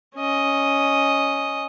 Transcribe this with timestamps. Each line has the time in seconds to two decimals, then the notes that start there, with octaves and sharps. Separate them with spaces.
0.16 C#4 D#5